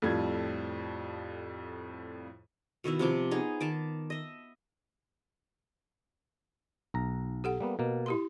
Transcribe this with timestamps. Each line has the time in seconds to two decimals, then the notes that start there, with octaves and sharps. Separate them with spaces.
0.02 F2 A2 F3 G3 G#6
2.84 B2 D#3 E4 E5
2.99 C3 F3 D6
3.31 B3 D#4 G#4
3.61 D#3 A5 D6
4.10 D#5 E5
6.94 B1 A#5
7.44 G4 A4 F#5
7.60 G3 A#3 B3
7.79 B2 A#3
8.06 E4 G4 C6